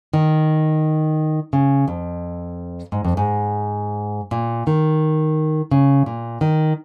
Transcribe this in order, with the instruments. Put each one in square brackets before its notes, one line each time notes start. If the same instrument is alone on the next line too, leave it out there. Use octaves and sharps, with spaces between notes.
[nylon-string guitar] D#3
C#3
F2
G#2
F2
G#2
A#2
D#3
C#3
A#2
D#3